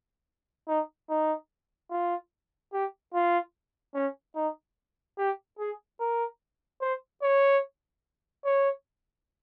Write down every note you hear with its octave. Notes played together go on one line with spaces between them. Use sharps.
D#4
D#4
F4
G4
F4
C#4
D#4
G4
G#4
A#4
C5
C#5
C#5